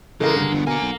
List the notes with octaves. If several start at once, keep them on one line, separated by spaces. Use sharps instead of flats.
C#3 E3 G#3 A#3 A4 A#4
G2 D3
G1 E2 B2
B2 A#3 F#5 G#5
B1